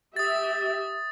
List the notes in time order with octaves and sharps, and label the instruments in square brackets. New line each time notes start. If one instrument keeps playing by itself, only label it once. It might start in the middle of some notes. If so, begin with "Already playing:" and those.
[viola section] G4 E5 [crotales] D#6 A6